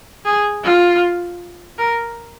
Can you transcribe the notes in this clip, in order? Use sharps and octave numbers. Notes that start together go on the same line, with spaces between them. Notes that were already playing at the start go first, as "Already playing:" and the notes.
G#4
F4
A#4